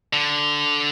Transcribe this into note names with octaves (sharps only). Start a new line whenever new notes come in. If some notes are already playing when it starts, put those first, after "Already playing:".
D3